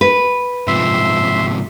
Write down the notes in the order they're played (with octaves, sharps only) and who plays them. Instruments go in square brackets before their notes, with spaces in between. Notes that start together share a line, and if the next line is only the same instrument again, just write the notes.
[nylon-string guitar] B4
[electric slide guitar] G#2 C3 F3 [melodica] E5 C6